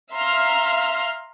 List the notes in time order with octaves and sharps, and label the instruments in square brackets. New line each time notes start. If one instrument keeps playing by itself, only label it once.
[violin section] E5 F5 A#5 C6 F6